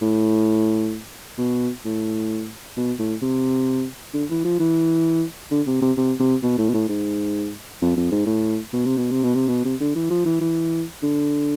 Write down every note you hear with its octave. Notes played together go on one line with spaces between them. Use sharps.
A2
B2
A2
B2
A2
C3
D3
E3
F3
E3
D3
C3
C3
C3
C3
B2
A2
B2
A2
G#2
F2
F2
G#2
A2
B2
C3
B2
C3
B2
C3
B2
C3
D3
E3
F3
E3
E3
D3